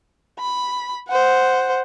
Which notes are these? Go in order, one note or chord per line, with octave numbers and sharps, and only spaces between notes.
B5
C5 F#5